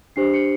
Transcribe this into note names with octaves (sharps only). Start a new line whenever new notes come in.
D4 G4 C5 C7
C#7